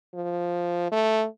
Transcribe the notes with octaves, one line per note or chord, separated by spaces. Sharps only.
F3
A3